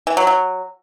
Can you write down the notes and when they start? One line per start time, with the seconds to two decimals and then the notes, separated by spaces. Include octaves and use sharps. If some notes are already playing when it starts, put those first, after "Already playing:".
0.07 E3
0.17 F#3
0.27 F#3